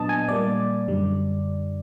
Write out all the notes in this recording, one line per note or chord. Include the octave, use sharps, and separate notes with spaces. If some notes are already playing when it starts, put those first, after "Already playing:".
Already playing: A#2 F#3 B3 D4 D#5 A5
G#5
A#2 G3 A#3 D5
F#2 D3 G3